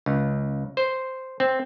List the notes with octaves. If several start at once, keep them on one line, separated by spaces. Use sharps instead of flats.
C#2
C5
C4